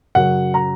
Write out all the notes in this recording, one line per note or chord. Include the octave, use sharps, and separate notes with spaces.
F#2 C#3 F#3 F#5
A#5